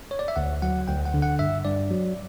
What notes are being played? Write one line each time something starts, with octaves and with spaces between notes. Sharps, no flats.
C#5
D5
E5
D2 F#5
F#3 F#5
D2 G5
F#5
D3
F#5
G2 E5
G2 D5
F#3